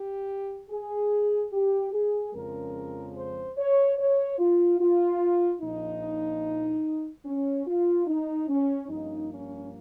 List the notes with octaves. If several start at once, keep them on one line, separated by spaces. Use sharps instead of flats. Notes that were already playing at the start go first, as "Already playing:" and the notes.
Already playing: G4
G#4
G4
G#4
F2 C#3 F3 G#3 C#4 A#4
C5
C#5
C#5
F4
F4
A#1 A#2 F3 D#4
C#4
F4
D#4
C#4
G2 F3 A#3 C#4 D#4
C#4